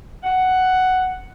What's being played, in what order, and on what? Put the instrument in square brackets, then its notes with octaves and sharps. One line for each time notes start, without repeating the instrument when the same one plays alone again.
[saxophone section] F#5